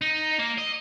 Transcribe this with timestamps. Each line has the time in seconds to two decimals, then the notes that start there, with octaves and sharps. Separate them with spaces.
0.02 D#4
0.39 A#3
0.58 D#5